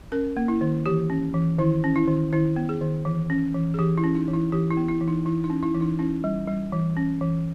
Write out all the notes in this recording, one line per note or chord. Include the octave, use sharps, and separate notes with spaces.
C#4 A#4
A#3
E4
D#3
E3 G4
C#4
E3
D#3 E4
C#4
E4
D#3
D#3 E4
B3
G#4
D#3
E3
C#4
E3
G#4
E3 G4
E4
C#4
D#4
E3
E4
E3 G4
E4
B3
E4
E3
D#4
E3 E4
D#4
C#4
E4
E3
D#4
C#4 E4
G3
G3
E3
C#4
E3